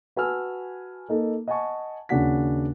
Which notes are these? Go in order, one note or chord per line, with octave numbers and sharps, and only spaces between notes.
F#4 B4 G#5 A5 E6 F6
A#3 D#4 A4
D#5 F#5 G#5 A5 C#6
D#2 C#3 D4 F#4 F#5 B6